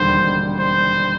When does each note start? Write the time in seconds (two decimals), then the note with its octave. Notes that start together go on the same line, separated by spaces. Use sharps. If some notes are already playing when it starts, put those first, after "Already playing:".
Already playing: E1 D#2 D3 G3 C5
0.59 C5